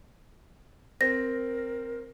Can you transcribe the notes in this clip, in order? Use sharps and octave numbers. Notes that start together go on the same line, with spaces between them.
C4 A#4 A#6